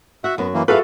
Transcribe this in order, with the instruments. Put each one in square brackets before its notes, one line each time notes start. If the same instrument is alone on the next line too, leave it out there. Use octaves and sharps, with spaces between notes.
[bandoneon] F#4 E5 [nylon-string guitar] F#5
[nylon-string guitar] F#2 F#4 [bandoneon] B3
[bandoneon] E3 A#3
[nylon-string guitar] F#2 F4 E5 [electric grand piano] F#4 A4 [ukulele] G#4 B4 [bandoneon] F5